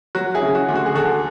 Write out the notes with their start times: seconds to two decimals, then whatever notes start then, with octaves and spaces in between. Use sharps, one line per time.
0.15 F#3 F#4
0.34 E4 G#4
0.42 C#3
0.55 F#4
0.69 D2
0.75 F#4
0.86 G#4
0.95 D2 F#4 A4